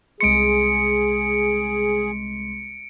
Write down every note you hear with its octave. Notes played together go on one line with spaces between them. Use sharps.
C2 G#3 G#4 C6 C#7 D7